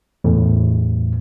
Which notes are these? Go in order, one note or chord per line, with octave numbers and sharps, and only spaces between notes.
E2 A2